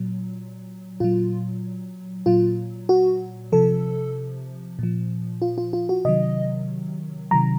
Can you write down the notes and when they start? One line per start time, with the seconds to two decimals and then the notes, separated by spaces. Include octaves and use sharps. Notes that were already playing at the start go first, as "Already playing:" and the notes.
Already playing: A#2 F#3
1.00 A#2 F#3 F4
2.26 A#2 F#3 F4
2.89 F#4
3.52 C3 F3 A4
4.79 A#2 F3
5.42 F4
5.58 F4
5.73 F4
5.89 F#4
6.05 C3 D#3 F#3 D#5
7.31 C3 D#3 F#3 A#5